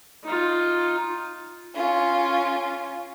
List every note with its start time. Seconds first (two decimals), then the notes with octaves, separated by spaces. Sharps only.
0.24 D#4 F4
1.75 C#4 F4